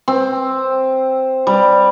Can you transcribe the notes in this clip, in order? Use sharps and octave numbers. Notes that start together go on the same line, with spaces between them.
C4
G3